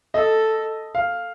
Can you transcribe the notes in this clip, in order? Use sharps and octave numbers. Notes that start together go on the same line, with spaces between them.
A4 D#5
F5